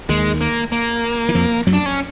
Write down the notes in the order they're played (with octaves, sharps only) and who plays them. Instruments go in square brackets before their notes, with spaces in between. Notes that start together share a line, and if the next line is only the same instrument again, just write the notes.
[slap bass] D#2 D#3 [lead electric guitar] G#3
[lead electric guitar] A#3
A#3
[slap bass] E3
F2 F3
F#2 F#3
[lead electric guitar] D4
C#4